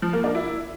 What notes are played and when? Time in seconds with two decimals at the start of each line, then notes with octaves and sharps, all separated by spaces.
0.02 F3
0.13 A#3
0.24 D4
0.35 E4